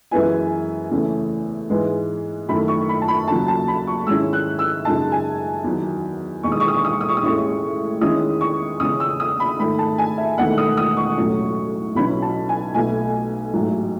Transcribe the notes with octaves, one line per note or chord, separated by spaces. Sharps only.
F#2 E3 G#3 B3 E4 G#5
E2 C#3 E3 A3 C#4
G#2 E3 G#3 B3
F#2 D#3 A3 E4 B5
C#6
B5
A5
B5
D#2 C#3 F#3 A5
A5
B5
C#6
G#2 D#3 G#3 C#4 E4 E6
F#6
E6
F#2 C#3 G#3 D#4 A5
G#5
E2 D#3 F#3
E1 E2 D#3 G#3 C#6
D#6
C#6
D#6
C#6
D#6
C#6
D#6
C#6
D#6
A1 A2 G#3 C#4 E4 C#6
E2 D#3 G#3 C#4 E4 D#6
C#6
E2 C#3 G#3 C#4 D#6
E6
D#6
B5
G#2 D#3 A3 B5
A5
G#5
E5
E1 E2 D#3 A3 F#5
D#6
D#6
C#6
B1 A2 F#3 C#4
B1 B2 F#3 C#4 E4 B5
A5
G#5
B1 B2 A3 G#5
A1 G#2 F#3